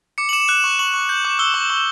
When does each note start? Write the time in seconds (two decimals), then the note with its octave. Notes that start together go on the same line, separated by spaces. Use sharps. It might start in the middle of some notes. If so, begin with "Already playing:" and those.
0.18 D6 C#7
0.29 F#7
0.33 D6 E7
0.48 F#6 E7
0.64 C#6
0.79 C#6 F#7
0.94 C#6
1.09 G6
1.25 D6
1.39 E6 G7
1.54 C#6
1.70 C#6